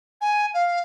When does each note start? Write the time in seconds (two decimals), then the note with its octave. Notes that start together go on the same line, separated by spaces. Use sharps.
0.21 G#5
0.53 F5